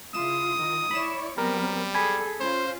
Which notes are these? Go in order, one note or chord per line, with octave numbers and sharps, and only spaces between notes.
C#3 E4 F4 D#6 E7
D#3 F4
E4 C#5 D5 B5 E7
F#3 G3 B3 C4 A#4
G#4 A4 G#5 B5
C#4 F4 C5